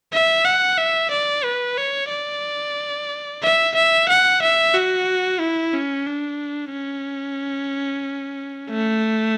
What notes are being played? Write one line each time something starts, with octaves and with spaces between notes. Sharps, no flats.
E5
F#5
E5
D5
B4
C#5
D5
E5
E5
F#5
E5
F#4
E4
C#4
D4
C#4
A3